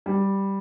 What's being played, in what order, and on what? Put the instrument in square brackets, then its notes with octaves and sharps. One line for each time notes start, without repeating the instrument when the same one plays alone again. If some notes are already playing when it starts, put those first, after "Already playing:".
[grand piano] G3